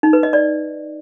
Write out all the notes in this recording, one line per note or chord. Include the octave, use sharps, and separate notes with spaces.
D#4
B4
D#5
D5